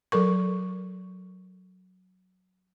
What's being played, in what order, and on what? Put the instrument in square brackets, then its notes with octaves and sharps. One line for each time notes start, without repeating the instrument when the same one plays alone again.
[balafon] F#3 A4 A#4 C#6